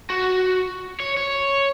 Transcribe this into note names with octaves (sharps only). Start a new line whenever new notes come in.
F#4
C#5
C#5